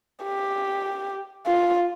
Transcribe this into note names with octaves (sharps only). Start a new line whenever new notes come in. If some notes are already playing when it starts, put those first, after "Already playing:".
G4
F4